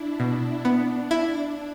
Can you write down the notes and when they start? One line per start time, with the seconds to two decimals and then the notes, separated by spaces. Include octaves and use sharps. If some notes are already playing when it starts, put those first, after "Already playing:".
Already playing: D4 E4
0.20 B2
0.65 B3 D4
1.11 E4